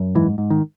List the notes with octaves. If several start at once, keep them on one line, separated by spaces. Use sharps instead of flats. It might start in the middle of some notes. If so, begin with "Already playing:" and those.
Already playing: F#2
G#2 E3
G#2
D#3